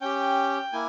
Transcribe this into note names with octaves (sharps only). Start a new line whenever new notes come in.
C#4 G4 G5
A#3 E4 G#5